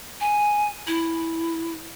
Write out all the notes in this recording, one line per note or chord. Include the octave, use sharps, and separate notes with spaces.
G#5
E4